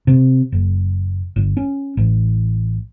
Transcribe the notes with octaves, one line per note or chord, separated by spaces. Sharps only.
C3
F#1
G1
C#4
A1